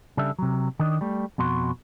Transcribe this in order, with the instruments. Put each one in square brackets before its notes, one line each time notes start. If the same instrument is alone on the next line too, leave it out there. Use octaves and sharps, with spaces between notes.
[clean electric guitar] C#3 G3 D4 A4 E5
C3 F#3
D#3 D4 D#5
G3 A3
F2 B2 F#4 C6